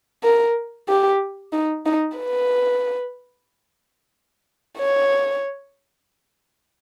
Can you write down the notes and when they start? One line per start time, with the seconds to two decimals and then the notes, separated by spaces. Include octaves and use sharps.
0.24 A#4
0.88 G4
1.53 D#4
1.86 D#4
2.18 B4
4.78 C#5